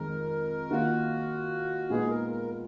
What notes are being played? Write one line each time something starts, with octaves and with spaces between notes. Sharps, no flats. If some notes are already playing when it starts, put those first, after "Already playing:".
Already playing: F2 D#3 G#3 A#4
D#3 A#3 F4 F#4
A#2 G#3 B3 D#4 G#4
A#4
A#4